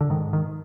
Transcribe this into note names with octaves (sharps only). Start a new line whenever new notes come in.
D3
G#2 D#3
D#3